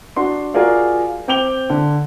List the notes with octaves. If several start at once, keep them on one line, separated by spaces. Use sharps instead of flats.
D4 F#4 C6
F4 F#4 G#4 A#4 D5 F5
C4 G5 D6 F7 G7
D3